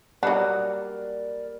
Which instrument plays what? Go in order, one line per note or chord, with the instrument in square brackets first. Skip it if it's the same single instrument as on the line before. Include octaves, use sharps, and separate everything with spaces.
[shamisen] F#3 D4 [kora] G3 A#3 D#5 [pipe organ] A#4 D5 [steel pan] F#5